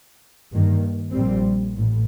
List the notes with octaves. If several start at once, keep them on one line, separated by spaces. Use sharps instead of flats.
G2 D#3 A#3
A#1 A#2 G3 C4
A1 A2